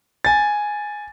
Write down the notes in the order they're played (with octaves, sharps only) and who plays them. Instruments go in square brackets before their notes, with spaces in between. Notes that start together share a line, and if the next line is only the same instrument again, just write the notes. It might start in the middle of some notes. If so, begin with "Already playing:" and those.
[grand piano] G#5 A6